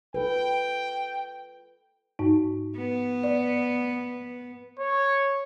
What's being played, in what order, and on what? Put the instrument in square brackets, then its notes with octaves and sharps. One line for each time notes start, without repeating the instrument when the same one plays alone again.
[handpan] F4 A4 B4 [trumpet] G5
[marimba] G#2 D#4
[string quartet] B3
[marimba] D5
[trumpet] C#5